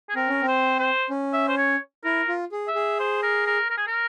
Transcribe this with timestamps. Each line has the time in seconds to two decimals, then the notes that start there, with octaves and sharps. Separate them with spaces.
0.09 G#4
0.16 C4 A#4
0.28 C#4
0.42 C4
0.47 C5
0.79 C5
1.10 C#4
1.33 E5
1.48 C5
1.57 C#5
2.04 E4 A#4
2.28 F4
2.52 G#4
2.67 E5
2.75 G#4
2.99 C5
3.23 A#4
3.47 A#4
3.70 A#4
3.78 G#4
3.87 A#4